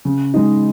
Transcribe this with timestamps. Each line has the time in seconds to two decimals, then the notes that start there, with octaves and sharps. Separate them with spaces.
0.05 C#3
0.34 G#3 D#4